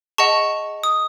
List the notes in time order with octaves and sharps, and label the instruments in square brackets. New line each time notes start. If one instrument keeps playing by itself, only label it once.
[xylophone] G#4 D#5 F#5 A5 C#6
D#6